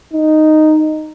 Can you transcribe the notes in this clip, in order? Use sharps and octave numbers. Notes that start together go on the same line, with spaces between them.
D#4